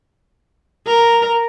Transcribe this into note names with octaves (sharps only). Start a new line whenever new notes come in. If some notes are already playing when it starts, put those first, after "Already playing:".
A#4